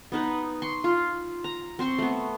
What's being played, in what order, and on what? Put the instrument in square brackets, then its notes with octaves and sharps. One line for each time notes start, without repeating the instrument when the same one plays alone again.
[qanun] B3 D#4 B4
C6 C#6
F4 F5
A#5
C4 C5 C6 C#6
A3 B3